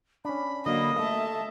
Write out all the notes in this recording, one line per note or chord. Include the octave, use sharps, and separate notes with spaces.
C#4 D4 B5
D3 F#3 A#3 D#5
A3 E5 A5